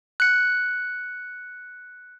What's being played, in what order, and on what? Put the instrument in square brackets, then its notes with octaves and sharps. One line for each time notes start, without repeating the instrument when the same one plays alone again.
[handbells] F#6 C#7